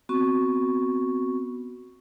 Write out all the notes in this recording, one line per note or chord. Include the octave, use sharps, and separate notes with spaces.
B3 C4 F#4 C#6